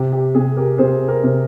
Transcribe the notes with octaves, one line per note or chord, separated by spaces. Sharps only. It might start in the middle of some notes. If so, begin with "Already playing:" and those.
Already playing: C3 G4
G4
C3 G#4
G4 A#4
C3 G#4 C5
G4 A#4
C3